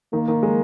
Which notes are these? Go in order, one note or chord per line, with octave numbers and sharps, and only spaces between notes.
D#3 A#3
D#3
G#3